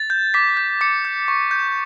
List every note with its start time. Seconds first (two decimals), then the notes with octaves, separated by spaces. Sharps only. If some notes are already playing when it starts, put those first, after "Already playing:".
Already playing: A6
0.10 G6
0.34 D6 B6
0.57 G6
0.81 D6 C#7
1.05 G6
1.28 C#6
1.51 G6